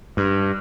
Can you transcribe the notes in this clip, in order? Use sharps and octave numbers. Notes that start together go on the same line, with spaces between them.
G2